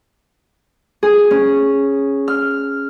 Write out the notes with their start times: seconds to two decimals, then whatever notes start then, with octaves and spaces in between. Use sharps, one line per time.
1.03 G#4
1.31 C#4
2.28 F6